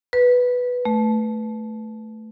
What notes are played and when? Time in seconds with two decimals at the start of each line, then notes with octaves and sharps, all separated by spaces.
0.13 B4
0.85 A3